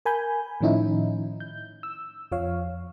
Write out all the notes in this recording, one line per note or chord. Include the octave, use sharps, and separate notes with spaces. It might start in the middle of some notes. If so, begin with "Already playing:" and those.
A#4 G#5 B5 G6
A2 D#3 F3 C#4 D#4 E4
G6
E6
F2 F3 C#5 F5